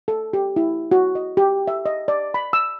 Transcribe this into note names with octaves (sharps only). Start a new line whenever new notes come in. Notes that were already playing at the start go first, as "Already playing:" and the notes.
A4
G4
E4
F#4
D#5
G4
E5
D#5
D5
B5
E6